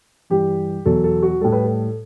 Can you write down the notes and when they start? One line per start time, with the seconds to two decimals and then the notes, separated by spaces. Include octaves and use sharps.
0.30 G2 E3 G3 G4
0.85 E2 B2 F#3 A4
1.04 A4
1.22 F#4
1.41 A2 G3 A4
1.52 B4
1.64 A4